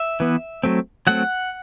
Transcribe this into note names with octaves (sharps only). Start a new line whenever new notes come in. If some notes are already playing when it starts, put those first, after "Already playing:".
Already playing: E5
E3 B3
F#3 A3 C4
F#3 A3 C4 F#5